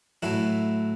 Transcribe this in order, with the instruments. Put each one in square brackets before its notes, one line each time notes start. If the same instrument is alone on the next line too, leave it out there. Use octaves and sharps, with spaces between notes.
[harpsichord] A2 F#3 A3 E4